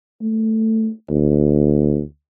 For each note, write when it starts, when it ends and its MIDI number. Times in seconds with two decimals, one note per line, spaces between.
0.22 0.90 57
1.10 2.01 38